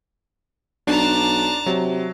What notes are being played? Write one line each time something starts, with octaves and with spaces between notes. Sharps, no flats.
B1 D4 A5 A#5
C3 F#3